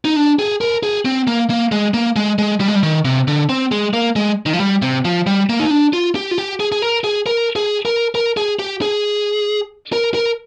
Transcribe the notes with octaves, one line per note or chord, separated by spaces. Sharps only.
D#4
D4
G#4
A#4
G#4
C4
A#3
A#3
G#3
A#3
G#3
G#3
G3
G#3
G3
D#3
C3
D3
C4
G#3
A#3
G#3
D#3
F3
G3
C3
F3
G3
A#3
D#4
D4
F4
G4
F4
G4
G#4
G#4
A#4
G#4
A#4
G#4
A#4
A#4
G#4
G4
G#4
A#4
A#4